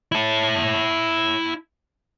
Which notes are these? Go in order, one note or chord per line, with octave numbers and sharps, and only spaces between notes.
E4 A5